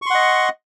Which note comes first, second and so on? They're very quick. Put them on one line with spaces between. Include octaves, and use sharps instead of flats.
C#6 C6 F#5 D#5